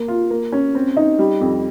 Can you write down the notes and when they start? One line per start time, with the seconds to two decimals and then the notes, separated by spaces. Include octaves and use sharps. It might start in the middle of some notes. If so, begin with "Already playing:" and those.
Already playing: A#3
0.08 F4
0.30 A#3
0.52 C#4
0.75 C4
0.97 D#4
1.19 G3
1.41 F2